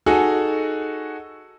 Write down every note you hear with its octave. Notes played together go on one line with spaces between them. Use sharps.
D#4 F#4 G#4 A4 D#5